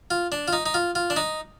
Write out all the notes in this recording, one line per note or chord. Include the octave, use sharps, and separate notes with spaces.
F4
D4
F4
D#4
D#4
F4
F4
D4
D#4